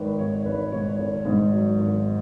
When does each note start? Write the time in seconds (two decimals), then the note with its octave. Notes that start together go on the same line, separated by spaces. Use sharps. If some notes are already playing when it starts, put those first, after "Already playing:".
Already playing: G#1 G#2 D#3 B4
0.19 G#1 C#5
0.46 G#1 B4
0.72 G#2 C#5
0.99 G#1
1.25 G#2
1.52 F#3
1.79 G#1